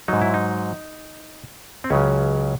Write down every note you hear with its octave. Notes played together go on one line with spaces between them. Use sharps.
G#2 F#3 D#4
E4
D#4
C4
C#2 C#3 F#3 C#4